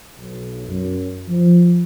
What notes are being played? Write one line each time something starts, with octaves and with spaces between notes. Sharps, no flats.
B1
F#2
F3